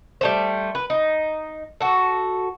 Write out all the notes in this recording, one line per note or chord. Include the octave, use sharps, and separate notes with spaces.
G3 A3 C5
B4
D#4
F#4 A4